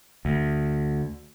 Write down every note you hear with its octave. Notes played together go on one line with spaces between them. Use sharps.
D2